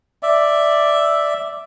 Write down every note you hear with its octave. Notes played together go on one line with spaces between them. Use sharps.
D5 E5